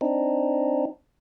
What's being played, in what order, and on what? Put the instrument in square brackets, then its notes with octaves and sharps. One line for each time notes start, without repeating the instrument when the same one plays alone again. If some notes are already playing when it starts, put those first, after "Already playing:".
[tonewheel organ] C4 D4 D#4